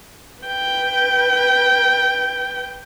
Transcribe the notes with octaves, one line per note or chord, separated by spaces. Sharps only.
B4 G5